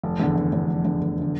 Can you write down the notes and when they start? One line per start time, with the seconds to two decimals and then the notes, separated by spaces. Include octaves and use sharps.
0.03 F1
0.20 E2 D3
0.35 F1
0.53 E2 D3
0.68 F1
0.85 E2 D3
1.01 F1
1.21 D3